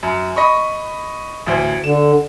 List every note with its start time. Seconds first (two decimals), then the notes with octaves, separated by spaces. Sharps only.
0.03 F#2
0.36 D#5 B5 C#6
1.46 A1 D2 C5
1.84 D3 E7